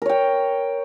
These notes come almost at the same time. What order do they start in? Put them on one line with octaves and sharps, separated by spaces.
A#4 C#5 G5